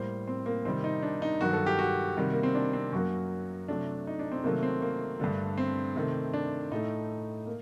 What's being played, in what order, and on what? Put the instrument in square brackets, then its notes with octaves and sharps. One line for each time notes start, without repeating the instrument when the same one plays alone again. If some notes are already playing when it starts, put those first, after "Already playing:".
Already playing: [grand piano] A2 G3 A#3 C5
C4
A#3
C3 D#3 G3 C4
D#4
D4
D#4
G2 D#3 F#3 F#4
A4
G4
F#4
C3 D#3 G3
A#3
C4
D4
C4
F#2 F#3 A#3 F#4
C3 F#3 A3 D4
D#4
D4
C4
C3 D#3 F#3 A3 A#3
C4
A#3
G2 D3 A3
C4
C3 D#3 A3
D4
A2 A3 D#4
A#3